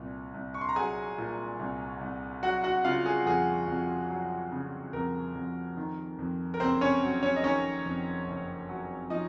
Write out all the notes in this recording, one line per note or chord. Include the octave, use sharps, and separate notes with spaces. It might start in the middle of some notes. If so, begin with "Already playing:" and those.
Already playing: C2 A#2
C2
C#6
C6
A#5
F#3 G#4 G#5
A#2
C2
C2
F#3 F#4 F#5
F#4 F#5
C#3 F4 F5
G#4
F2 G#4
F2
F#3
C#3
F2 A#4
F2
D#3
F2
A#4
F#1 C4 C5
C#4 C#5
F#3
C#4 C#5
D#5
D#3 C#4 C#5
F2
F#1
F#3
F3 D#4 D#5